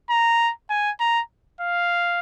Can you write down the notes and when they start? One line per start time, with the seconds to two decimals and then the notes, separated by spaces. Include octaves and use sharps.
0.10 A#5
0.70 G#5
1.00 A#5
1.61 F5